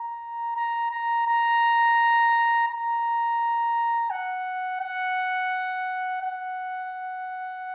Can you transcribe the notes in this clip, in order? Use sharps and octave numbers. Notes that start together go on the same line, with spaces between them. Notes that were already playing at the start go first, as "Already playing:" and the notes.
Already playing: A#5
A#5
A#5
A#5
A#5
F#5
F#5
F#5